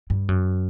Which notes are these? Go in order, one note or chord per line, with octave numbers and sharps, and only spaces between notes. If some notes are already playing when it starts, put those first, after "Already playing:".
G2
F#2